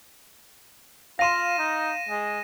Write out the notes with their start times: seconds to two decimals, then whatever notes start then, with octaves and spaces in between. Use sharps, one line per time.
1.19 F4 F5 C6 A#6 D#7 E7
1.58 D#4
2.09 G#3